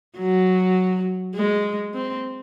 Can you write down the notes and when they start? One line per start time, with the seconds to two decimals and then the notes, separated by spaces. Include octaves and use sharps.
0.18 F#3
1.35 G#3
1.94 C4